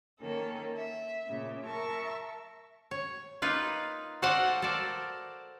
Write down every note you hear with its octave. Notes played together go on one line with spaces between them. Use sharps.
D#3 A#3 C#4 A4
E5
A#2 C#3
A#4 E5 A5 C#6
C#5
A#3 D#4 F4 B4
F#4 A4 C5 D5 F5 F#5
A4 A#4 C5 D5